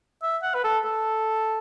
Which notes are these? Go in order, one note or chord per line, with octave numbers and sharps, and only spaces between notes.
E5
F#5
B4
A4
A4